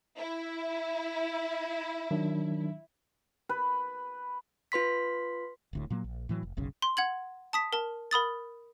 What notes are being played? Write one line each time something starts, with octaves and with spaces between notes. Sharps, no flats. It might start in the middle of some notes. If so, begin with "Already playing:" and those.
E4
D#3 F#3 D4
B4
F4 B4 C6 B6
D1 D2 A2
A#2 F#3 A#3
A#1
A2 E3 F#3
F1
F#1 B1 C#3
C6
F#5 G#6 F#7
A5 D#6 B6
A#4 A5
A#4 B5 D#6 A6